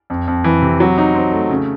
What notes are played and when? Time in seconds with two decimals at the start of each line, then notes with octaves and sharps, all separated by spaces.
0.10 F2
0.27 F2
0.44 E3
0.62 C3
0.80 F#3
0.98 D#4
1.15 C4
1.32 A3
1.50 C#3